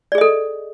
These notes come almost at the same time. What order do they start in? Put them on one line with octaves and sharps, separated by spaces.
D5 G#4 D#5 A4